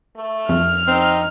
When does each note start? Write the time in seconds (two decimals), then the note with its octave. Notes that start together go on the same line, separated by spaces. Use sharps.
0.16 A3
0.49 F2 F6
0.87 C4 D#4